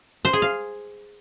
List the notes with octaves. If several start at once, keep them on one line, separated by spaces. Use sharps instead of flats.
C5
G#4
F5